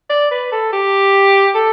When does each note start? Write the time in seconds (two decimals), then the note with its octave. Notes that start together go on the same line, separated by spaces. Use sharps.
0.09 D5
0.31 B4
0.52 A4
0.73 G4
1.55 A4